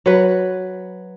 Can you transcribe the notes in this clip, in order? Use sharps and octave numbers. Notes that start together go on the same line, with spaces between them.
F#3 B4